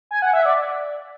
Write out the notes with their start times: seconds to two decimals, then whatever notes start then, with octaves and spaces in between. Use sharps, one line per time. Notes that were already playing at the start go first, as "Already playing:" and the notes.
0.11 G#5
0.22 F#5
0.33 E5
0.46 D5